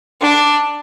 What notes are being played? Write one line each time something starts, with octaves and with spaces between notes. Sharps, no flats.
D4